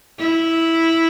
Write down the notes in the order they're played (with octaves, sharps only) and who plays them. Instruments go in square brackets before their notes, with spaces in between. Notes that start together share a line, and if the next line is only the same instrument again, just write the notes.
[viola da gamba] E4